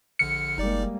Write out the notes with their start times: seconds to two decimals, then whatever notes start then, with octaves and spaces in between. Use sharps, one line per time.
0.19 A#1 D3 F6 C#7
0.58 F#1 G3 G#3 A#3 D#4 D5 D6